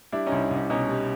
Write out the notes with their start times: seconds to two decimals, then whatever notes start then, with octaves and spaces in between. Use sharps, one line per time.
0.12 G3 D4 E4
0.27 C#4 D#4
0.32 C2
0.51 C2 C#4
0.70 B2 C#4 D#4
0.89 G3